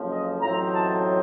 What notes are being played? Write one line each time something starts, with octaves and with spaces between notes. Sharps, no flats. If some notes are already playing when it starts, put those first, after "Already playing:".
Already playing: F#1 F2 C#3 F3
D#5
A1 A2 F#3 C4 D#4 A#5
A5